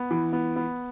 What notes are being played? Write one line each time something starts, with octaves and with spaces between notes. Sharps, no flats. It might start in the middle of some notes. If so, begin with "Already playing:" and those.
Already playing: B3
E3
B3
B3